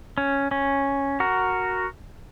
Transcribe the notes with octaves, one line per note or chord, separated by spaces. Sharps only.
C#4
C#4
F#4 A#4